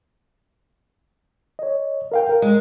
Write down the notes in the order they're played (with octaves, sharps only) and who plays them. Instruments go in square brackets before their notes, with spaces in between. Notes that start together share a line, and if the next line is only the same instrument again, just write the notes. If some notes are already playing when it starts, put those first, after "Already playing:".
[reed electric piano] C#5 D#5
A#4 F5 G5
A#4
[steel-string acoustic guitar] G#3